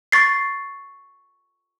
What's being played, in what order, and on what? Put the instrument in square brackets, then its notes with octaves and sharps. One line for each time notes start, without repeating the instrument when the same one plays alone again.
[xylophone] C#6 A6 C7